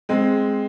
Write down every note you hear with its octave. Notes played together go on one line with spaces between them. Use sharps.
G#3 C4